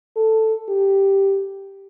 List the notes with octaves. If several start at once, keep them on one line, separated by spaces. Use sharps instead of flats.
A4
G4